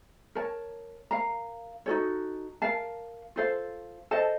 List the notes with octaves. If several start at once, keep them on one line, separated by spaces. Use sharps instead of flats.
A#4 C#5 A5
A#4 F5 A#5
D#4 F#4 A4 C#5
A#4 F5 A5
F4 A4 C5 F5
A4 C5 D#5 A5